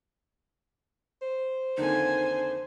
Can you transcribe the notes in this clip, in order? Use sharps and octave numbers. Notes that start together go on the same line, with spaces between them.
C5
F2 D3 D#3 A#3 D#4 G#5